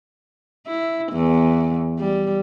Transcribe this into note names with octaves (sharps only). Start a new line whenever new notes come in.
E4
E2
G3